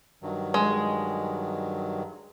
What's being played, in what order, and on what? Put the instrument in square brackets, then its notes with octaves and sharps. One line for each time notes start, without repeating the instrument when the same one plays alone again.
[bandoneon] G2 D#3 F#3
[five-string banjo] G#3